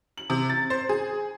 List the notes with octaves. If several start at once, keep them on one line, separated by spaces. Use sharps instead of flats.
F#7
C3
A6
C5
G#4